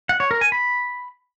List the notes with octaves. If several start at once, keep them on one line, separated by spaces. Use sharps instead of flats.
F#5
C#5
A#4
G#5
B5